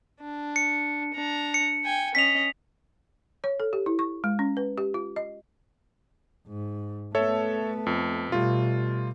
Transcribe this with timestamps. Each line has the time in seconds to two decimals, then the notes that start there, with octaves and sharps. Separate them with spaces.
0.21 D4
0.56 C#7
1.14 D4 A#5
1.54 C#7
1.85 G5 G#5
2.15 C#4 D#5 B6 F7
3.44 C#5
3.60 A4
3.73 G4
3.86 E4
3.99 C#6
4.24 G#3
4.39 C#4
4.57 B4
4.78 G4
4.94 F4
5.16 D#5
6.47 G#2
7.15 A3 B3 A4 C#5 E5
7.86 F2
8.32 B2 G3 A3 F4